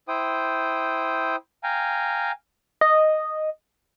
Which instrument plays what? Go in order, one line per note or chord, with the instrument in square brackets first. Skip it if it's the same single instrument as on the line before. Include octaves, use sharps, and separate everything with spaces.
[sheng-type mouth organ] E4 C5 G5 D#6
F5 G5 G#5 A#5
[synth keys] D#5